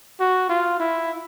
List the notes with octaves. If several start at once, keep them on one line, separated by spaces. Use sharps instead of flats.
F#4
F4
E4